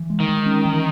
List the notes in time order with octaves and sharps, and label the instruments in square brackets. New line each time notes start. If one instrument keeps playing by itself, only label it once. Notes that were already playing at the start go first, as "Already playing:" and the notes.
Already playing: [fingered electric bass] E3
G#3
[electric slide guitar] D#3
[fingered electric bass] G#3
C#4
E3